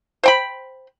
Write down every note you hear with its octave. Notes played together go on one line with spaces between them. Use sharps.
C5 G5 B5